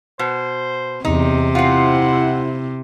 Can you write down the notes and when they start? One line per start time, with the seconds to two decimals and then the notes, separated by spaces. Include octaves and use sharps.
0.19 B2 C5
1.05 E2 C3 D#4
1.55 C4 E4 F4 F#5